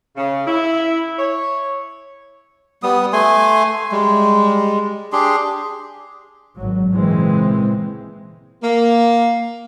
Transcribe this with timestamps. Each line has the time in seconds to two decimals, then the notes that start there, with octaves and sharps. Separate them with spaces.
0.16 C#3
0.47 E4
1.19 C#5
2.83 G3 B3 D#6
3.13 A3 G#5 C6
3.92 G3 G#3
5.13 D4 G4 G#4 C6
6.55 G#1 F#3
6.91 A#2 C#3 E3 G#3 C4
8.63 A#3